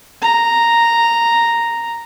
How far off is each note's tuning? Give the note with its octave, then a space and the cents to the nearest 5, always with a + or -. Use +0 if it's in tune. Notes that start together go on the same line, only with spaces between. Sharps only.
A#5 -5